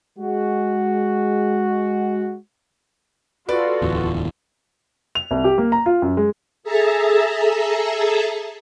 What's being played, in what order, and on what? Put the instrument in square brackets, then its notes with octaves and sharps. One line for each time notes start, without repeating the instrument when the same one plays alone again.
[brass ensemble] G#3 F#4
[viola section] F4 F#4 A4 [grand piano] B4 [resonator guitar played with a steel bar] D5
[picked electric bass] D1 E2
[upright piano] F7
C2
G4
A#3
A#5
F4
F#2
G#3
[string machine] G#4 A4 E5 A5 A#5